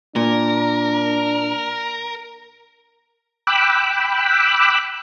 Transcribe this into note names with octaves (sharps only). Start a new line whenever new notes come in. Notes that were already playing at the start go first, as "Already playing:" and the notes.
A#2 D4 A#4
G5 B5 D6 E6 F#6